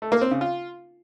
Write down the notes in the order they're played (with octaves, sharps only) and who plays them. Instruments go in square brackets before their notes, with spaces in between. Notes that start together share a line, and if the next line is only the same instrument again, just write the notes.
[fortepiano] A3
A#3
C4
C#3
F4